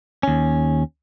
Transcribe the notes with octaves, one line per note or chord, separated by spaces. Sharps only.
D#2 C#4